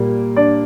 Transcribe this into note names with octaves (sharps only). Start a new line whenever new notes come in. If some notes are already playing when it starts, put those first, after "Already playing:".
Already playing: A#2 G3 A#3
D4 D5